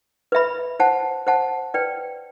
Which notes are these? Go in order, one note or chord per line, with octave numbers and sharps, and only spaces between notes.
B4 E5 B5
C5 F#5 A5
C5 F#5 A5
B4 D5 G5